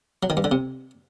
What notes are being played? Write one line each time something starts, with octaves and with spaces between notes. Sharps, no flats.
F#3
D#3
G2
D3
C3